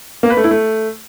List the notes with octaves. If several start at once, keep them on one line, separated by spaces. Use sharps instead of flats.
A#3
B4
A3
E4
A3